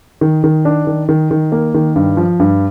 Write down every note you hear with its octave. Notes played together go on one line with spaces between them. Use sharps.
D#3
D#3
D4
D#3
D#3
D#3
A#3
D#3
G2
F3
G2